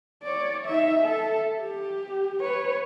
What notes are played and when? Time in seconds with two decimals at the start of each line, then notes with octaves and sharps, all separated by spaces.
0.23 C#5 D5
0.66 D#4 E5
1.03 A4 E5
1.61 G4
2.41 B4 C#5